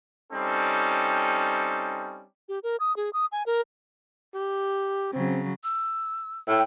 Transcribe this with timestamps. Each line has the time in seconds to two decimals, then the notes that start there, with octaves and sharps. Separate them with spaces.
0.33 G3 C4 C#4 D#4 A4
2.49 G4
2.63 A#4
2.80 D#6
2.97 G#4
3.13 D#6
3.32 G#5
3.46 A#4
4.34 G4
5.13 C#3 F#3 C4
5.64 E6
6.48 A2 G5 E6